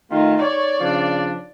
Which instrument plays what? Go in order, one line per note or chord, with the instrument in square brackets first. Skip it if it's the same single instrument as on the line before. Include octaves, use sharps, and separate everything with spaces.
[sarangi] D#3 [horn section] A3 F4
[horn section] C#5 [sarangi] D5
[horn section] C#3 F3 D4